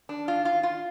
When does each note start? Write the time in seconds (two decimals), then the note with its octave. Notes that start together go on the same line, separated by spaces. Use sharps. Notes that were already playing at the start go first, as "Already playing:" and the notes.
0.09 D4
0.28 F4
0.45 F4
0.63 F4